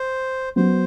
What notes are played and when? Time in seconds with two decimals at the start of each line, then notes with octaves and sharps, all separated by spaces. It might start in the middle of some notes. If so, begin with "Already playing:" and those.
Already playing: C5
0.56 F#3 B3 F#4 C5